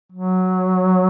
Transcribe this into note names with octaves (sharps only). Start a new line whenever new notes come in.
F#3